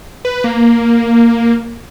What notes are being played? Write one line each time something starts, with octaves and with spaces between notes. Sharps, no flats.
B4
A#3